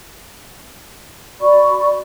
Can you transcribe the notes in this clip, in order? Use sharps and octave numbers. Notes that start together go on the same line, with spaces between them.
F#4 D5 B5 C#6